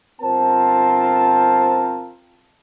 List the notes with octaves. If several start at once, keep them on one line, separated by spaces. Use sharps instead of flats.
G1 C4 F4 A#4 C5 A5